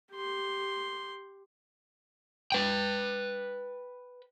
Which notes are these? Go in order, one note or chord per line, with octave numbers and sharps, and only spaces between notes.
G4 C6
B4 G5